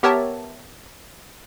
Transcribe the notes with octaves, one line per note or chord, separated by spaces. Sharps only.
B3 G4 A#4 C#5 E5 A5